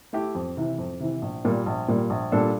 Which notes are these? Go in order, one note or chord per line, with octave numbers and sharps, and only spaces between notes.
A3 E4 G4
F2
C3 E3
F2
C3 E3
A#1
A#2 G3 A#3
A#1
A#2 G3 A#3
A#1
A#2 G3 D4 A4